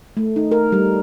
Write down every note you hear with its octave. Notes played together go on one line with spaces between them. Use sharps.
A3
D#4
A#4
G3